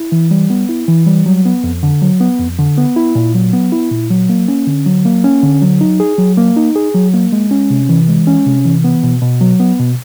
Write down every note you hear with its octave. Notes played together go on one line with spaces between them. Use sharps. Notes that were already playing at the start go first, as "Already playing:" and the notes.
Already playing: E4
E3
G3
B3
E4
E3
G3
F#3
B3
F2
D3
F#3
B3
F2
D3
B3
E4
A#2
F#3
B3
E4
A#2
F#3
A#3
C#4
D3
F#3
A#3
C#4
D3
F#3
D#4
G#4
F#3
A#3
D#4
G#4
F#3
A#3
G#3
C#4
C3
E3
G#3
C#4
C3
E3
B3
B2
B2
F#3
B3
B2